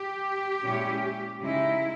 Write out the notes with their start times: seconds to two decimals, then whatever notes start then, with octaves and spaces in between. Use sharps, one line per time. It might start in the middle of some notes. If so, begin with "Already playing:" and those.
Already playing: G4
0.64 A#2 G#3 C#4 E4
1.42 C#3 G#3 D#4 E4